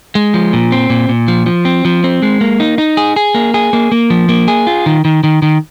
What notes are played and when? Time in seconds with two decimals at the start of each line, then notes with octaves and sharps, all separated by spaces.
0.15 G#3
0.34 F3
0.53 A#2
0.72 C4
0.90 A#2
1.09 A#2
1.28 F3
1.46 F3
1.65 C4
1.85 F3
2.04 C4
2.22 G#3
2.41 A#3
2.60 D#4
2.78 D#4
2.97 G#4
3.16 G#4
3.35 A#3
3.54 G#4
3.73 A#3
3.92 A#3
4.10 F3
4.29 A#3
4.48 G#4
4.67 F4
4.86 D#3
5.05 D#3
5.24 D#3
5.42 D#3